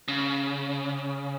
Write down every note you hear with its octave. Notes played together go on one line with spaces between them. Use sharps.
C#3